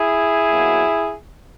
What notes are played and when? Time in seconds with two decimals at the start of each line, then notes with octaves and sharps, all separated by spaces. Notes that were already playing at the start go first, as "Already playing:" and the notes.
Already playing: E4 G#4
0.50 B2 F#3 A#3